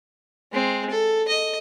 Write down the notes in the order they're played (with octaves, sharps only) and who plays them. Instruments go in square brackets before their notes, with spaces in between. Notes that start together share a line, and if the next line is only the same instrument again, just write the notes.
[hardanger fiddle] G#3 C4
A4
D#5